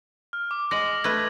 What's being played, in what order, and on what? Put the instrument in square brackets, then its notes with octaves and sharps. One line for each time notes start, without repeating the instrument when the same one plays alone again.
[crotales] F6
D6
[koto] G#3 [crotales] A#6 F#7
[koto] A3 B4 [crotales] G#6 A#6